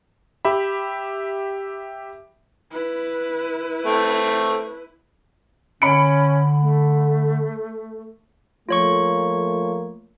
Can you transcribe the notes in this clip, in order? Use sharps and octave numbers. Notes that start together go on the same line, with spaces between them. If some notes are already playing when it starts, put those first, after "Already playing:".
G4 E5 B5
E4 B4
A3 C4
D3 C#4 B5 C#7 D7
A3
F3 A3 A#3 F4 C#5 C#6